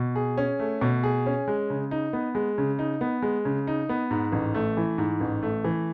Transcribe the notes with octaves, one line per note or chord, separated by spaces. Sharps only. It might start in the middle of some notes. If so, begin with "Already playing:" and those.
Already playing: B2
G#4
C#4
A3
B2
G#4
C#4
G#3
C#3
D#4
B3
G#3
C#3
D#4
B3
G#3
C#3
D#4
B3
G#2
A1
A3
E3
G#2
A1
A3
E3